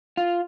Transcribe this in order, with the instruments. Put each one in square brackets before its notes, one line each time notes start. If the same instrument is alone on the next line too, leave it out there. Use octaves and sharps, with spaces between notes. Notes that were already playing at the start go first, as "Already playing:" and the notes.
[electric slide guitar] F4